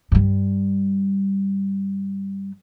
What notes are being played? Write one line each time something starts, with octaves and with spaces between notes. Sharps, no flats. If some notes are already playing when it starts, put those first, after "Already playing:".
G2 G3